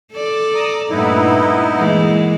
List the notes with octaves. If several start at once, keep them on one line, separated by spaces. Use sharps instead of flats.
A4 D5
A#5 D#6
G2 A#2 A3 B3 D#4 E4
E3 G#3 A#3